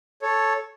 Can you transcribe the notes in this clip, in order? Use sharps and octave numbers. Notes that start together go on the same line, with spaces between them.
A4 C#5